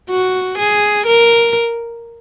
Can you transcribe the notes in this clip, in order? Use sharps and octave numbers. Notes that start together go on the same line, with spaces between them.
F#4
G#4
A#4